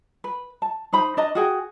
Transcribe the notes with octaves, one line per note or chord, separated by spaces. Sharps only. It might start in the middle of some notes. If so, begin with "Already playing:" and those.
B4
A5
D#4 C5 B5
D4 D#5 A#5
F#4 G#4 G5